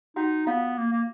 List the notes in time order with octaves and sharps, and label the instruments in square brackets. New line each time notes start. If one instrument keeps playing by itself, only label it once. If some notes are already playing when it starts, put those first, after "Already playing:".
[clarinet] D#4 [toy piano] F#4 F#5
[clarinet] B3 [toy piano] F4 F5
[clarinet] A#3
A#3